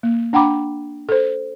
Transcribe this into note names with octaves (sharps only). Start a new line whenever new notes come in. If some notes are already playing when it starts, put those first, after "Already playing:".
A#3
D4 F#5 G5 A#5 B5 D6
A4 C5